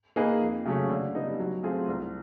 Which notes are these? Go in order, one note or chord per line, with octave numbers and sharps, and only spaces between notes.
A#3 D#4 G#4 B4
F2
C#3 F#3 A3 C#4
D3
G3 B3 D#4
F#3
A3 C4 F4 G#4
C2